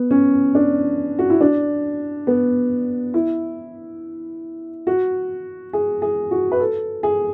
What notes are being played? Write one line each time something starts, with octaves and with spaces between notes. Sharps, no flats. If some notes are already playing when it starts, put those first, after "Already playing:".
Already playing: B3
C#4
D4
F#4
E4
D4
B3
E4
F#4
G#4
G#4
F#4
B4
A4
G#4